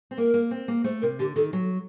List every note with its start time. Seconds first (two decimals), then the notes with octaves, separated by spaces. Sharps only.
0.11 C4
0.18 A#3 A#4
0.34 A#3
0.51 C4
0.68 A#3
0.84 A3 C5
1.02 C3 A#4
1.19 D3 G4
1.36 D#3 A4
1.53 F#3